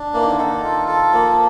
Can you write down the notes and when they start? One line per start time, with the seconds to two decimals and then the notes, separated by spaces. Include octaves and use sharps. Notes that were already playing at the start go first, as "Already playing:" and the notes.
Already playing: D4
0.14 E3 A#3
0.23 D#3
0.30 D3
0.39 D#3 A4
0.64 F4
0.88 A4
1.13 F3 A#3